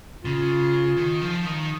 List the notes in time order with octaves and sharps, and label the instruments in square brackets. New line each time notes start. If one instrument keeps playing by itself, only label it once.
[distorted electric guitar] C#3 [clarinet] F4
[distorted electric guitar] D#3
F3
D#3